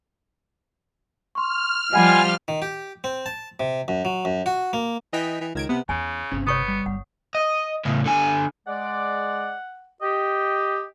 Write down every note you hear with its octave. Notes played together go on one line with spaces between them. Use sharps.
C6 C#6 F6
F3 G3 F4 D#5 F#5 G#5 B5
D#3
G4
C4
A5
C3
F#2
F#3
F#2
F#4
A#3
E3 D#5 G5 B6
E3
C#2 D#3 G#6 D7
C3 B3
E2 C#3 E3 G#5
G1 C3 C4 C#4
C3 B3 C#5 C#6 D#6
G3
G1 F#5
D#5
A2 C#3
D3 G#5
G#3 D5 F#5
G4 D#5